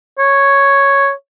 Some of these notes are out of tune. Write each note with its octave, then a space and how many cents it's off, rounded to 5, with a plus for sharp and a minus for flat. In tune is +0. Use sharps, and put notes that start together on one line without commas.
C#5 +0